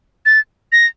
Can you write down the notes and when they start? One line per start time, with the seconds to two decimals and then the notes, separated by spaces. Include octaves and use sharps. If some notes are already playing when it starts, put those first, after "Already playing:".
0.26 A6
0.72 A#6